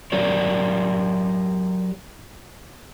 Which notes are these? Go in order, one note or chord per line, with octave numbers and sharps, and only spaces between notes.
F#3 G4 A#4 C#5 D5